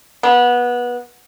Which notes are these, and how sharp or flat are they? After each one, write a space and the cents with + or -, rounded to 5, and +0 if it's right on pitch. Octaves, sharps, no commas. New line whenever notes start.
B3 -20